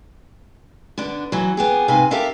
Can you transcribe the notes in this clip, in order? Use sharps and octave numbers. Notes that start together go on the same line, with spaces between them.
D3 B3 D4
E3 F#3
F2 B3 G4 G#4
G#2 C3 B4 F5 G#5
G4 A4 A#4 E5 F5 A5